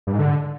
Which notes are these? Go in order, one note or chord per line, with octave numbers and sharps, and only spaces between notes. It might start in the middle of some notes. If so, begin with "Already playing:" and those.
G2
G#2
D3